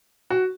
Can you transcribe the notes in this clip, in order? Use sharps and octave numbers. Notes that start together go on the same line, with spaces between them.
F#4